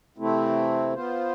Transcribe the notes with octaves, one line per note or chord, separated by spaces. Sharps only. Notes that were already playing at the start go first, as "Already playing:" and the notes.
C3 E3 A3 C4 E4
B3 F4 C5